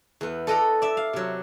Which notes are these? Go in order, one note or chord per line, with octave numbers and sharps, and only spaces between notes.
E2 B3
A4 D5 D#5 F#5 A#5 B5
D5 E5
F5
C3 F#3